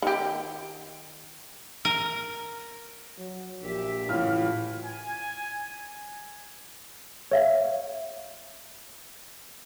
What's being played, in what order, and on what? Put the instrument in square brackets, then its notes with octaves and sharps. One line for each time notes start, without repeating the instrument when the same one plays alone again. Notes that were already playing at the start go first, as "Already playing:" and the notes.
[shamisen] D#3 G4
[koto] A#4
[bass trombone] F#3
[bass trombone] A#1 [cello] G4 E5
[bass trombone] F#1 [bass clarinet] A2 [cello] E3 A3 [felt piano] F4 F6
[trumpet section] G#5
[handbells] C#5 E5 F5